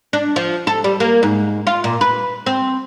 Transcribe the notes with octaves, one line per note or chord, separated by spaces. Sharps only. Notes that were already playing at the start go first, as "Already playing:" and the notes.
D4
F3
A4
G3
A#3
G#2
F4
A#2
B4
C4